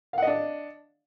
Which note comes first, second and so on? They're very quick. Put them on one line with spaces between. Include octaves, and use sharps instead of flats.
F5 F#5 D#5 D4